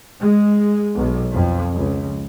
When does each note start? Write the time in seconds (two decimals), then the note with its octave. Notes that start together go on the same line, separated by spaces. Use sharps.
0.20 G#3
0.95 B1
1.33 F2
1.73 C#2